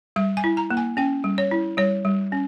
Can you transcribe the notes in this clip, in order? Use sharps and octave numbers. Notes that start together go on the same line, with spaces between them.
G3 E5
G#5
E4
A#5
A#3
G#5
C#4 G5
G3
C#5
E4
G3 C#5
G3
C#4